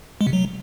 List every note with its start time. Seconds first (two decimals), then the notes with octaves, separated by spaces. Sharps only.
0.21 G#3
0.27 C3
0.33 F#3